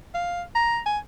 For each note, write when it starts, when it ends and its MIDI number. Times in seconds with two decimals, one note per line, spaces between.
0.14 0.42 77
0.55 0.79 82
0.86 0.98 80